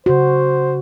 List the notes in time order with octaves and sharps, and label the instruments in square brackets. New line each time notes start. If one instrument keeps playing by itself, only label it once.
[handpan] C#3 F#4 [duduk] C5